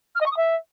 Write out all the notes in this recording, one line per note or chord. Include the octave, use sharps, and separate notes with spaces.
F6
D#5
C#6
D#6
E5